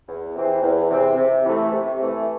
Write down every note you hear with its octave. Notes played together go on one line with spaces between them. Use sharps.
E2
C3 E3 C4
E2
C3 E3 C4
C3
E3 A3
C3
E3 A3